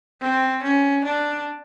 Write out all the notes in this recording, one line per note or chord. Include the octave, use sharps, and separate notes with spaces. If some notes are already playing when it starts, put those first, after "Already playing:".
C4
C#4
D4